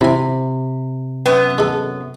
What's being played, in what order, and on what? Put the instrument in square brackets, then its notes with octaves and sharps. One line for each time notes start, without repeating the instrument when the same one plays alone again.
[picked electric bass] C3 [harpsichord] E4 G#5
[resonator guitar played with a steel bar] F#2 B3
[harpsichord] G#3 A4